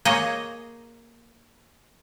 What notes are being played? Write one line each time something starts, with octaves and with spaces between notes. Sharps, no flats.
A#3 G#4 C#5 D#5